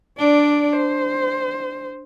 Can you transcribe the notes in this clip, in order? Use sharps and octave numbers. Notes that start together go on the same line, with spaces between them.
D4 D5
C5